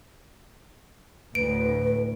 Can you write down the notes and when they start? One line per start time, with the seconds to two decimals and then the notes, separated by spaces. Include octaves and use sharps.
1.35 D2 A2 B4 D7